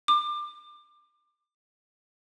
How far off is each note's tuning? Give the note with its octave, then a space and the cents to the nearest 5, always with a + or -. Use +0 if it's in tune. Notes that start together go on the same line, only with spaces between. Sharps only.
D6 +25